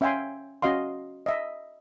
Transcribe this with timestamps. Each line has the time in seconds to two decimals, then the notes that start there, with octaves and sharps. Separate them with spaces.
0.01 C#4 E5 F5 G5 G#5 C6
0.62 C#4 F#4 D#5 F5 C6
1.26 D#5 E5